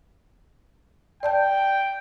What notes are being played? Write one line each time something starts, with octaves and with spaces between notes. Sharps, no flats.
D5 G5 A5 G6